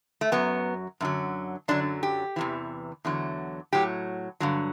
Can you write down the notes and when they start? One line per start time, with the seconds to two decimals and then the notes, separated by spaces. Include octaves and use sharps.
0.21 A3
0.32 F#2 F#3 B3
1.01 F#2 D3 F#3
1.68 F#2 D3 F#3 D4
2.03 G4
2.36 E2 C3 E3
3.05 E2 D3 F#3
3.73 A2 F#3 G4
4.40 G2 D3 F#3